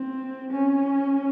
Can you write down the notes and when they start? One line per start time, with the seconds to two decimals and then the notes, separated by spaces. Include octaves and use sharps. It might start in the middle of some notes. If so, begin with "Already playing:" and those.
Already playing: C4
0.50 C#4